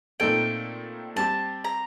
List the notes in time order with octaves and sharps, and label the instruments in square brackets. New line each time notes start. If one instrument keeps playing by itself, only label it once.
[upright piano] A#2 A3 C4 D#4 A4 [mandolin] G5
[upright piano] G3 C4 G4 [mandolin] A5
[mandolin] A#5